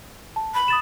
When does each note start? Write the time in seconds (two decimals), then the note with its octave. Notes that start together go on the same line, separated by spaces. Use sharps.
0.36 A5
0.55 B5
0.68 D#6 A6 E7